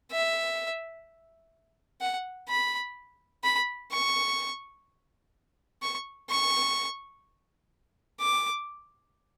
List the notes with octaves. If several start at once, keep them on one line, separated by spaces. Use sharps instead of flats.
E5
F#5
B5
B5
C#6
C#6
C#6
D6